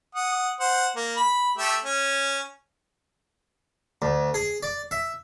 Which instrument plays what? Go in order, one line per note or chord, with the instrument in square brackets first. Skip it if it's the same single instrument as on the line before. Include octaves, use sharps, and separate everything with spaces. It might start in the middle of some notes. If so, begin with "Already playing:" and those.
[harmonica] F#5 D#6
C5 F#5
A#3
B5
A3 G4 E5
C#4
[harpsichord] D2
G#4
D5
E5